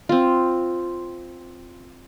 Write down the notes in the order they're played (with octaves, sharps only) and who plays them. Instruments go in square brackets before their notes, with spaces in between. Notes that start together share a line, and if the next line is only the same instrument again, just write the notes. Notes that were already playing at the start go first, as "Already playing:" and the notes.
[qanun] C4 F4